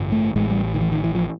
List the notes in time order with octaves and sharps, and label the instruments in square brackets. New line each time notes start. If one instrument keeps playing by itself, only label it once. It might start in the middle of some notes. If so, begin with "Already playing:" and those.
Already playing: [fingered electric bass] A1 G2 D3
A3
A1 A2 G#3
G3
D#3
E3
D#3
E3
F3